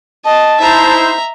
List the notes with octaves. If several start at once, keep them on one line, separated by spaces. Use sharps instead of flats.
D#5 A5
D#4 E4 C5 E5 A#5